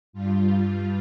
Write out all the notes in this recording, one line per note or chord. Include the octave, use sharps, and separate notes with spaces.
G2 G3 F4
F4